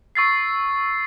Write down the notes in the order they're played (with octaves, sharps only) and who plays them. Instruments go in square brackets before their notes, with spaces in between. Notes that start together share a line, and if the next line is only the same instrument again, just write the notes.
[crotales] C#6 E6 A6 C7